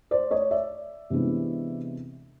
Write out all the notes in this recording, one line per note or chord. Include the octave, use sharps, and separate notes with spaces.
C5 D5
C#5 D#5
D5 E5
C3 E3 G#3 B3 D4